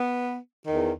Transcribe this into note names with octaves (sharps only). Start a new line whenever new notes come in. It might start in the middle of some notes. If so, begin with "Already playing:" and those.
Already playing: B3
E2 D#3